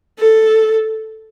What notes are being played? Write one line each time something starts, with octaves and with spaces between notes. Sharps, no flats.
A4